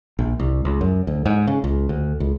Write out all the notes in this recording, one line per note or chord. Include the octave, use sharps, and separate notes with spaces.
A#1
C2
C#2
F#2
D2
G#2
C#3
C#2
D2
C#2